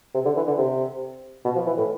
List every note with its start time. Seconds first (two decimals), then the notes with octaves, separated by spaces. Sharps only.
0.14 C3
0.25 D3
0.36 E3
0.47 D3
0.58 C3
1.45 B2
1.55 F3
1.67 E3
1.77 A2